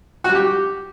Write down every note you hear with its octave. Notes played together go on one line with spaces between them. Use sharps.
F#4
G3
G4